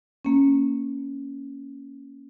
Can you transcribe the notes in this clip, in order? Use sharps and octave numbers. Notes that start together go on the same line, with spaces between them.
A#3 C#4